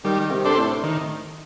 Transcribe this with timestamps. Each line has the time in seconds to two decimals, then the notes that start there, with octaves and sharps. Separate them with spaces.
0.04 D#3 G3
0.31 C3
0.45 D4 A4 C5
0.58 A2
0.83 D#3